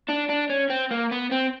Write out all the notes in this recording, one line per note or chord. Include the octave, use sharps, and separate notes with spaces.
D4
D4
C#4
C4
A#3
B3
C4